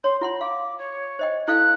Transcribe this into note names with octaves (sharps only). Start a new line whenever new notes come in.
C#5 C6
F4 F#5 A#5 C6
F5 D6
C#5
C5 D#5 G5
E4 A4 F5 F#6